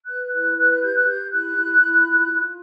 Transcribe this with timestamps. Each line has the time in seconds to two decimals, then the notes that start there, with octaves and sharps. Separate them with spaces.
0.07 B4 F#6
0.32 E4 F#6
0.56 B4 F#6
0.69 F#6
0.81 G4 G6
0.93 F#6
1.06 G4 G6
1.30 E4 F#6
1.55 E4
1.80 E4
2.05 F4
2.29 F4